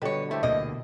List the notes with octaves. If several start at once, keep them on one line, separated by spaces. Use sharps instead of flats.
B2 D3 G3 B4 C#5
A3 E4 G4 C5
D2 B2 A#3 D#5